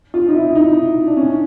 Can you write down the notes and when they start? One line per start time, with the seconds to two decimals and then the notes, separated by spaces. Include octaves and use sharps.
0.14 F4
0.28 D#4
0.35 E4
0.55 D#4
1.07 D4
1.17 C#4